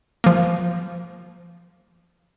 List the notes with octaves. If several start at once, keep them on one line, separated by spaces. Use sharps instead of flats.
F3 A#3